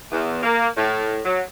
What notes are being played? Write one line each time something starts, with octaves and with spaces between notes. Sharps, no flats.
E2
A#3
A2
F#3